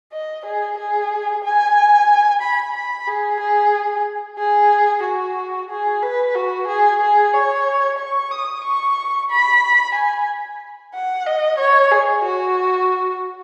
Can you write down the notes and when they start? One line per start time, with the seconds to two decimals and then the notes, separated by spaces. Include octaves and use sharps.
0.12 D#5
0.46 G#4
0.78 G#4
1.44 G#5
2.42 B5
2.75 B5
3.07 G#4
3.40 G#4
4.38 G#4
5.04 F#4
5.70 G#4
6.03 B4
6.35 F#4
6.68 G#4
7.01 G#4
7.33 C#5
7.99 C#6
8.31 D#6
8.64 C#6
9.30 B5
9.95 G#5
10.94 F#5
11.26 D#5
11.59 C#5
11.91 G#4
12.25 F#4